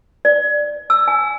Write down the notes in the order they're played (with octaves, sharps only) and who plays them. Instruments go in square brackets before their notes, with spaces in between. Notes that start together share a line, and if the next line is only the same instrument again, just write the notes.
[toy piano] D5
E6
G#5